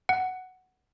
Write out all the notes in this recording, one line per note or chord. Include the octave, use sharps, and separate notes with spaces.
F#5